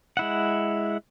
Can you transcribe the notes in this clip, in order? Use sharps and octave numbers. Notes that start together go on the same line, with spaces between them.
G#3 E4 F#5